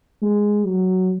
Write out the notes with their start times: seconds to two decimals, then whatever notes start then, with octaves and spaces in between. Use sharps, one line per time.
0.23 G#3
0.65 F#3